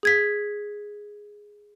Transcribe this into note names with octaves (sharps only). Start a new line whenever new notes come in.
G#4 G#6 B6